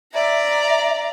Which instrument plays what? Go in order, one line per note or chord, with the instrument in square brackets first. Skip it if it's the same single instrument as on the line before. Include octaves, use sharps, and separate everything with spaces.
[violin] D5 A#5 [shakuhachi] E5